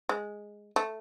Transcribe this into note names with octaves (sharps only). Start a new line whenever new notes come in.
G#3
A3